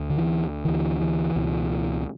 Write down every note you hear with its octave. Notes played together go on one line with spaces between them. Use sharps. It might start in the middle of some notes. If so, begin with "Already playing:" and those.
Already playing: D2
D3
E3
D2 D3 E3
E3
C#2 B2